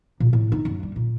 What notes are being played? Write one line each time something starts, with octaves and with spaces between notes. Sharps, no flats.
A#2
A2
D#4
F#2
G3
A#2